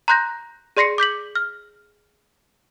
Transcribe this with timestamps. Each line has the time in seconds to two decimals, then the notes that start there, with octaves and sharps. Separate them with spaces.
0.08 A#5 C6 F#6 G6 A#6
0.77 G#4 D5 C6 A#6 C7 C#7
0.98 D6 G6 B6 F#7
1.35 F6